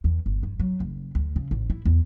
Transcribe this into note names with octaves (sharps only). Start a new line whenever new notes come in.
E2
G1
G2
F#3
F#1
D2
C#3
A1
E4
E2